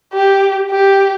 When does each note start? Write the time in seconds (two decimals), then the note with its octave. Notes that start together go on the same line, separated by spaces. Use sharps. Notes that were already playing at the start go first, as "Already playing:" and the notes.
0.13 G4
0.71 G4